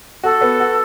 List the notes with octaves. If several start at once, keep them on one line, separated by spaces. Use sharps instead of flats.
F#4 A4
B3
F#4